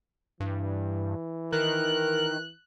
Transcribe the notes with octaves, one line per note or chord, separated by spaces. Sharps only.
G2 E3
D#3 A#4 F#6